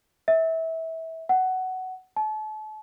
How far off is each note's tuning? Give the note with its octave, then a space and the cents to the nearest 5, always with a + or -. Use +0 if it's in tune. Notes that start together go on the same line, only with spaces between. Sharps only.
E5 -25
F#5 +10
A5 -35